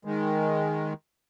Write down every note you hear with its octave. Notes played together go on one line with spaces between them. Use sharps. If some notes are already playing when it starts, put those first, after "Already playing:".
D#3 G#3